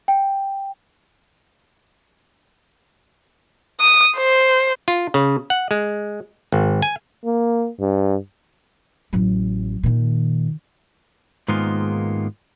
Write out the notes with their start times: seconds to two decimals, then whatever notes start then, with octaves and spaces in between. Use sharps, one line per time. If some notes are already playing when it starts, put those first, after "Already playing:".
0.08 G5
3.80 D#6
4.18 C5
4.88 F4
5.14 C#3
5.50 F#5
5.71 G#3
6.52 G#1
6.82 G#5
7.25 A#3
7.80 G2
9.13 A1 F#3
9.83 A#2 D#3
11.48 G#2 D#3 G#3 A#3 B3 F4